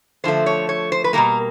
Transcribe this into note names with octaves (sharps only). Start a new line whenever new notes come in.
D3 F3 A3 C5
C#5
C#5
C5
B4
B2 G3 A#3 A#4